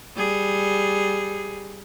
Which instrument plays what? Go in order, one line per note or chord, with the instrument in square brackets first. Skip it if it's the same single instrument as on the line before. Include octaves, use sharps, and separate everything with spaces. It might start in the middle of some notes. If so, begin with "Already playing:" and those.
[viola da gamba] G3 G#4